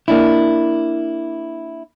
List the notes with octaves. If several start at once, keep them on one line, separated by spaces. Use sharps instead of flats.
A#3 D4 E4